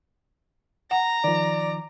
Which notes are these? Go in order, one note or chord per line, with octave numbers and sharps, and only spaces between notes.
F#5 A#5
D#3 F3 D5